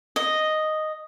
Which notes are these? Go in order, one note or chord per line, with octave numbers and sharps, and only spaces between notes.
D#5